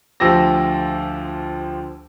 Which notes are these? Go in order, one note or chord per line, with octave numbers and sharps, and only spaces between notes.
D2 F3 G4 E6 A#6